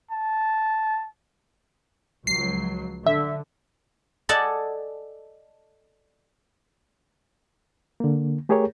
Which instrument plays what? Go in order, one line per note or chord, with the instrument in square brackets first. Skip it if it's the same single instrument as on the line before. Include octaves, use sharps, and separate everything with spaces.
[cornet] A5
[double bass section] C#2 F3 F#3 [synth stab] C7
[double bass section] D3 [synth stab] E5
[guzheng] A4 D5 D#5 F#5 G#5 A5
[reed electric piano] D3 A#3
A3 G4 G#4 A#4 C#5